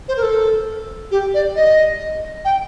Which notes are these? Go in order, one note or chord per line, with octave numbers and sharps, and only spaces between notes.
C5
A#4
A4
G4
D5
D#5
G5